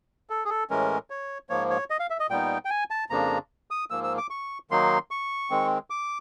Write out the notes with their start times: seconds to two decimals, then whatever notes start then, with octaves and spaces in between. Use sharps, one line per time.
0.30 A4
0.45 G#4
0.50 A4
0.70 A2 E3 G#3 C#4 A#4
1.10 C#5
1.50 G#2 F3 A#3 C#5
1.70 C#5
1.90 D#5
2.00 F5
2.10 E5
2.20 D#5
2.30 A#2 G3 B3 D#4 G5
2.65 G5
2.70 G#5
2.90 A5
3.10 F2 C#3 F3 A#3 D4 A#5
3.71 D#6
3.90 G#2 F3 A#3 E6
4.04 E6
4.18 D6
4.30 C#6
4.70 D#3 F#3 A#3 D#4 C6
5.11 C#6
5.50 D#3 G#3 C4
5.90 D6